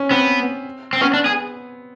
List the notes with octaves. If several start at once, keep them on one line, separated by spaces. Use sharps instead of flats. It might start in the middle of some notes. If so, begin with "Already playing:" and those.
Already playing: C#4
B3 C4
C4
B3 C#4
D4
G#4